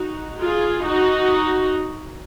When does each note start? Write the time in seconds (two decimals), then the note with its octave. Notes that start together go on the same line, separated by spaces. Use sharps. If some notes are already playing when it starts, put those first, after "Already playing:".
Already playing: D#4 F#4
0.41 F4 G#4
0.84 D#4 F#4